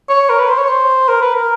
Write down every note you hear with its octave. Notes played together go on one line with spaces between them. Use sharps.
C#5
A#4
B4
C5
C#5
C5
A#4
B4
A#4